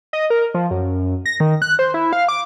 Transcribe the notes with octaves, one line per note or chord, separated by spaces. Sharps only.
D#5
A#4
F3
F#2
A#6
D#3
F#6
C5
E4
F5
D6